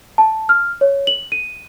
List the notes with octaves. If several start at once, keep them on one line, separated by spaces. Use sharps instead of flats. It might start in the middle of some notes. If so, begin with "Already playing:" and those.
A5
F6
C#5
F#7
D#7